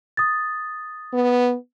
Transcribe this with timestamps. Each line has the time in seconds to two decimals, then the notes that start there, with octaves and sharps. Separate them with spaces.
0.17 D#6 A6
1.13 B3